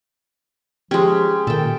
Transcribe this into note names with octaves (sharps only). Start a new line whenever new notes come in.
F3 G#3 C#4 G4
A#2 D#3 A4 G5